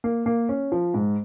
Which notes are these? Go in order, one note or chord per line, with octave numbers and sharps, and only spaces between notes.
A#3
A#3
C#4
F3
G#2